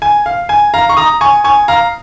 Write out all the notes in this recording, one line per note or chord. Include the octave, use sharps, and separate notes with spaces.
G#5
F5
G#5
F5 A#5
C#6
A#5 D#6
G#5 C#6
G#5 C#6
F5 A#5